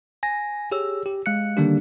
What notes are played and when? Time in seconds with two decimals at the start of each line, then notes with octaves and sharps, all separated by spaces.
0.23 G#5 A#6
0.72 G4 G#4 C#5 E6
1.06 G4
1.26 G#3 F5 F#6 C#7
1.57 D3 D#3 G3 A#3 D4 G4